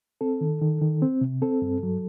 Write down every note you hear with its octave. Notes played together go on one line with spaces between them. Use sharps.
C4 A4
D#3
D#3
D#3
C4
C3
C4 A4
G2
F#3